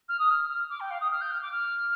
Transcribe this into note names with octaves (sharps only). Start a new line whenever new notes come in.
F6
D#6
F6
F6
D6
G5
F5
D#6
F6
G6
F6
D6
F6